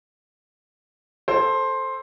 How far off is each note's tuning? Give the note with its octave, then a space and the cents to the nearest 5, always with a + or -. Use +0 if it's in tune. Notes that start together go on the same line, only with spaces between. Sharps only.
A4 +0 C5 +10